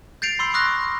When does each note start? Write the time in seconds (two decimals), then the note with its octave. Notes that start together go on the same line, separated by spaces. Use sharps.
0.22 G6 A6 C7 D7 F7
0.39 B5 C6 E6 C7
0.54 C#6 D#6 F6 F#6 A#6